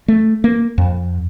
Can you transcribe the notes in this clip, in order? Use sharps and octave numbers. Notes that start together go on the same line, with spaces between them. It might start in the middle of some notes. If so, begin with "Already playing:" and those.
A3
A#3
F2